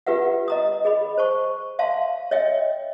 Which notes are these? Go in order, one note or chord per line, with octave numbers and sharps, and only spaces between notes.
F4 G4 B4 E5 F#5
D#5 A#5 D#6
G#4 D#5 B5
C5 A5 C#6
E5 F5 A5 C6
C#5 D#5 E5 G5